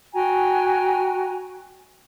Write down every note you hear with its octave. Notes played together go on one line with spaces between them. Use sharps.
F#4 G5 G#5 A#5